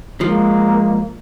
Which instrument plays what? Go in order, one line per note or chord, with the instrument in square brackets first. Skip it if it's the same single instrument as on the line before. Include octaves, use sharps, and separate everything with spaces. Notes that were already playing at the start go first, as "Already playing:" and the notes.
[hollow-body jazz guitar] F3 [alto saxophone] G#3 [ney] A#3